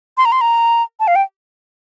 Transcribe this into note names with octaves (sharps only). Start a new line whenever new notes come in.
C6
A#5
C6
A#5
A5
F5
G5